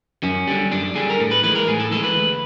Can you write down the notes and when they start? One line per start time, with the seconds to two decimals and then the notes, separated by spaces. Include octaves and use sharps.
0.23 F#2 C#4
0.47 D3 G3
0.71 F#2 D4
0.95 D3 G3 G#4
1.10 A#4
1.20 A2 A4
1.31 B4
1.43 E3 G#3 B4
1.55 A#4
1.68 A2 G#4
1.80 A4
1.91 E3 G#3 A4
2.03 B4
2.16 D2